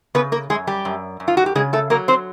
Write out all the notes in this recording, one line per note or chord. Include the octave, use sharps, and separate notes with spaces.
C#3 B3 B4
A#3 A#4
F#2 G#3 G#4
G3 G4
F#2
F#2
F4
F#4
G4
C#3 G#3 G#4
A3 A4
F#3 A#3 A#4
C4 C5